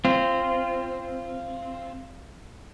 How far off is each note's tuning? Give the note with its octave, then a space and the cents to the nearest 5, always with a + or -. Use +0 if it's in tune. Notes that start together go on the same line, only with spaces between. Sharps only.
C4 +5 F4 -15